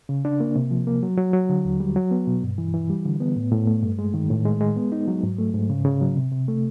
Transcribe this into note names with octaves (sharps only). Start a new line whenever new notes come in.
C#3
D4
A#3
C3
F3
A#3
F#3
F#3
F#3
D3
D#2
G3
F#3
B3
B2
G2
E3
E3
G3
D3
B3
A2
A2
A3
G2
G#3
D#3
A2
G#3
G#3
B3
D#4
F#3
G#2
A3
G#2
C#3
C#3
F#3
C3
C3
A3